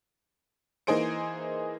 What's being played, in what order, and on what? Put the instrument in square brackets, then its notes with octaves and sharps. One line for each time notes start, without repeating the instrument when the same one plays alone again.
[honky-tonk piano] E3 A#3 D#4 G#4 C5 D7